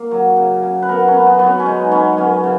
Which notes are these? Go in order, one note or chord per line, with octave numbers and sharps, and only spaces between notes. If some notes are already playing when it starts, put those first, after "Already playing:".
Already playing: A#3 A#4
F#3
C#3
C#3
B4
B3 A#4
C#4
B3
B3
F#3 B3
C#4
C#4
G#3 D#4
B3 C#4
F#2 C#4
C#3